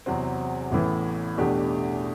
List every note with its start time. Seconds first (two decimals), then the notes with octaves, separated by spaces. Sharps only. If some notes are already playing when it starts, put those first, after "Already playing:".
0.06 E2 C3 F#3 C4
0.72 A1 A2 E3 B3
1.38 E2 B2 A3 D4 G4